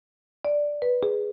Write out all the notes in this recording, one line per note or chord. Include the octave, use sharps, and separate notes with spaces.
D5
B4
G#4